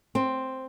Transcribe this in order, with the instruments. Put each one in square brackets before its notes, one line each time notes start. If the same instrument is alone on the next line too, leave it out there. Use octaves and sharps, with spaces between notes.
[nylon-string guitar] C4